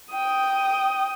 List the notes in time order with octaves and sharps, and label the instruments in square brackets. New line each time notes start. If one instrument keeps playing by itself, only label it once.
[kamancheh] G5 D#6